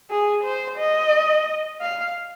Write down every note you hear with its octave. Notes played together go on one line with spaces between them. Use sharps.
G#4
C5
D#5
F5